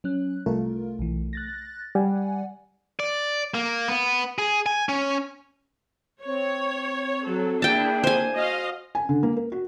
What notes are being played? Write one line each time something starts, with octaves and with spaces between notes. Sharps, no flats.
F#3 C#4 F#6
C2 A3 F4 A#4
B1 E3
F#6 A6 A#6
G3 D5 F#5 G#5
D5
A#3
B3
G#4
G#5
C#4
C4 C#5
F#3 A4
A#3 D4 E4 G#4 G5 A5
C5 G#5
F#4 D#5 F5
G#5
D3
A#3
A#4
F#4